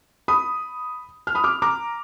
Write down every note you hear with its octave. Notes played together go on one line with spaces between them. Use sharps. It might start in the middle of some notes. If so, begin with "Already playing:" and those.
B5 D#6
F6
B5 D#6
D6 F6
A#5 D6